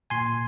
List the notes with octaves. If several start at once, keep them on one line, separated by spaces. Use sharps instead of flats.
A#2 G#5 C6